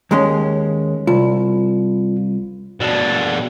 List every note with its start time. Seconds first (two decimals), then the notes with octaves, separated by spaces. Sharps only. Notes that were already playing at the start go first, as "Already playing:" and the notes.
0.11 D#2 G#3 C#4
1.07 C2 F4
2.80 B2 D4